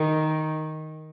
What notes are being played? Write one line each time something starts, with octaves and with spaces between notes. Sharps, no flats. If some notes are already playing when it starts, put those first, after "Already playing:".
Already playing: D#3